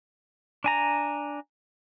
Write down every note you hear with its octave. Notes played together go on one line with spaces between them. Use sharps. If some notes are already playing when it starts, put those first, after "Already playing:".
D4 G#5 A#5